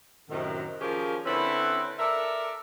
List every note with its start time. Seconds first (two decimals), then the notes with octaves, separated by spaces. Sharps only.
0.30 F#2 A2 C3 D#3
0.81 F3 C#4 F4 G4 G#4 A#4
1.25 D3 C4 C#4 E4 B4
1.99 A4 A#4 D5 E5